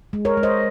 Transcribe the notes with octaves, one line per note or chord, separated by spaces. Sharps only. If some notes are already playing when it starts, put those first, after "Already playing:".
G#3
A#4 C#5
G#3
C5 D#5